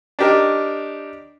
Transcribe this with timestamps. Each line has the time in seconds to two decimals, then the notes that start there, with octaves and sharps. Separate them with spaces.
0.19 D4 D#4 G4 A#4